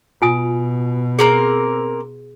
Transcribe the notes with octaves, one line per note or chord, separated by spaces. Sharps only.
B2 F4 G#5 D#6
A#3 C4 G#4 A#4 C6